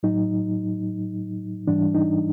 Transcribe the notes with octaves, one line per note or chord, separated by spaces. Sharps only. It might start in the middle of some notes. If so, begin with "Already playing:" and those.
A2 F#3 D#4
G#2 E3 G3 D4
D#4